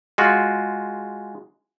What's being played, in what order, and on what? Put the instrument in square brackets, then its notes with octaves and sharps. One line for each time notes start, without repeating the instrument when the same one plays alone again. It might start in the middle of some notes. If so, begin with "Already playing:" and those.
[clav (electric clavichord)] G#3 F4 F#4